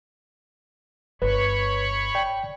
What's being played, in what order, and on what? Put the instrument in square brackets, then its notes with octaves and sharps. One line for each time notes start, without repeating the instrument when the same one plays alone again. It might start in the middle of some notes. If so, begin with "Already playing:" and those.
[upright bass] G1 [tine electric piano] B4 [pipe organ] C#5 B5 C#6
[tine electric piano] D5 G5